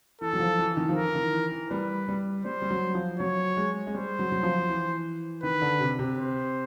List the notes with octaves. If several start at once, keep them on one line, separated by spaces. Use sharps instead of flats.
E3 A4
F#3
F3
E3
D#3
F3
E3 A#4
D#3
E3
E3
G3 B4
G3
G3 C5
G3
F#3
F3
F#3 C#5
G#3
G#3
G3 C5
F#3
F#3
F3
E3
D#3 B4
D3
C3
C3
C5